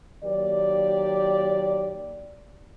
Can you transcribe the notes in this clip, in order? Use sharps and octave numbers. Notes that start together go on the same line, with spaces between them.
D#3 F#3 A#3 G4 D5